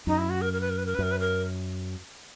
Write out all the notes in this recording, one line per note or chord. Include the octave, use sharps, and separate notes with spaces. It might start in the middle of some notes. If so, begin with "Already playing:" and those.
F#2 D#4
E4
F#4
A#4
A#4
B4
A#4
B4
A#4
B4
F#2 A#4
B4
A#4